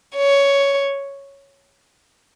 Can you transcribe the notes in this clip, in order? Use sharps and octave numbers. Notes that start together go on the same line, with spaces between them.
C#5